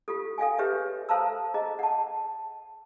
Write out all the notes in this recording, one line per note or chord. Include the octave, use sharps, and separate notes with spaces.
F4 G4 A4
A4 F5 G5 G#5
G4 G#4 B4 C#5 E5
A4 C5 F5 A5 A#5 E6
G#4 D#5 A#5
F#5 A5